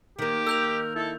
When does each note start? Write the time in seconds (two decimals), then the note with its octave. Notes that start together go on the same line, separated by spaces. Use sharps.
0.19 D#3 A#3 G4
0.47 A#4 E6 G6 F7
0.96 E4 A4